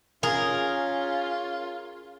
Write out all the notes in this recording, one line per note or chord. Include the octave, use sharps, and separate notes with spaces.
C#4 F4 G#4 A#4